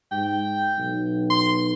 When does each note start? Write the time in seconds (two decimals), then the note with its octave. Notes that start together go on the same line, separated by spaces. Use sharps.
0.12 G#2 G5
0.78 B1
1.30 C6